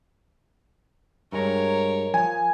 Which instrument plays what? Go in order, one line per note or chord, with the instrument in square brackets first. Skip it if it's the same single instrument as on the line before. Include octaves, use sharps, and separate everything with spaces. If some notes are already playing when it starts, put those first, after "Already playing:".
[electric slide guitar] G2 G#3 A#5 [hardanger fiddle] A#4 C#5
[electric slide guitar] F3 [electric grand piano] G#5